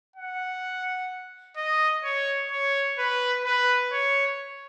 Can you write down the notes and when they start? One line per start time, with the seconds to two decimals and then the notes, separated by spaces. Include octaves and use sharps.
0.16 F#5
1.57 D#5
2.04 C#5
2.52 C#5
2.99 B4
3.45 B4
3.92 C#5